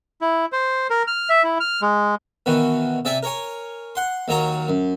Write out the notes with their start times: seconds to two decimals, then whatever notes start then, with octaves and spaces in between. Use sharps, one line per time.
0.21 E4
0.52 C5
0.90 A#4
1.07 F6
1.29 E5
1.44 E4
1.60 F6
1.82 G#3
2.46 B2 D#3 E3 F#4
3.05 C3 D5 E5 G#5
3.23 A#4 C#5 G#5
3.95 F#5 C6
4.28 D#2 D#3 F#3 C#5 A#5
4.69 F#2